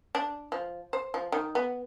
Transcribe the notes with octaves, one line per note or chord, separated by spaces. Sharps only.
D4
F3
C5
F3
D#3
B3